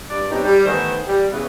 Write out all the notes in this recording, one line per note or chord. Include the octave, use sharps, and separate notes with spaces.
G2 D5
F#3 B3 C4 D4 D#4 G4
G3
D#3 E3 A3 B3 C5
G3
C#3 E3 B3